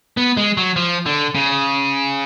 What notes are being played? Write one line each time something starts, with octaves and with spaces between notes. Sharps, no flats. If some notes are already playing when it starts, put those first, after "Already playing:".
B3
G#3
F#3
F3
D3
C#3